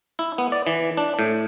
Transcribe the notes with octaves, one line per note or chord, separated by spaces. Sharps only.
E4
B3
D5
E3
D4
A2